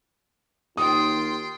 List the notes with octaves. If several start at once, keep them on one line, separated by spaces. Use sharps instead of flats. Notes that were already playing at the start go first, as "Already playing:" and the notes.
D#2 F4 G5 C6 D#6